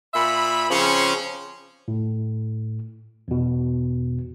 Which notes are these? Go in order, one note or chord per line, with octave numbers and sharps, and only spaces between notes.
A#2 E5 B5
C#3 F3 C4 C#4
A2
E2 B2